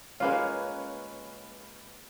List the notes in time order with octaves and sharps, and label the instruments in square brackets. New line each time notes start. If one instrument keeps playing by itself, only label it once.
[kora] G#3 A#3 F4 [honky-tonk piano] C#4 B4 C#5